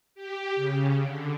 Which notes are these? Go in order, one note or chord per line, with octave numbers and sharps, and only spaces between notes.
G4
C#3
D3